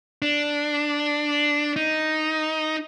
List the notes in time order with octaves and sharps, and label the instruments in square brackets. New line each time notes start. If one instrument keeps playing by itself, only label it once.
[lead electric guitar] D4
D#4